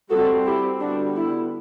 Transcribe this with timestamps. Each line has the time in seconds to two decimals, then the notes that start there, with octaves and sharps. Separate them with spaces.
0.10 G3 C4 F#4 A4
0.45 E4 G4
0.80 D3 G3 B3 D4 F#4
1.16 E4